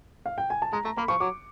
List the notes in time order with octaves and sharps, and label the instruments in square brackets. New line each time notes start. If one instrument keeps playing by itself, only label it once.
[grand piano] F5
G5
G#5
A5
[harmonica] G#3 [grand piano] A#5
[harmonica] A3 [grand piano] A#5
[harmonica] A#3 [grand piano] B5
[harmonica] F3 [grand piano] C#6
[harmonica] F#3 [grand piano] D6